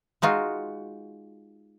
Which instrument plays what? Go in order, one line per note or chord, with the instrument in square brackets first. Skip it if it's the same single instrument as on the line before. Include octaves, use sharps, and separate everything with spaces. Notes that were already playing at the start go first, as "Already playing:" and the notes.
[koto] G#3 D#4 F4 F#4